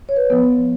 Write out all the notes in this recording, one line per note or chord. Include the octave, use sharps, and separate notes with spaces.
C#5
B4
F3 B3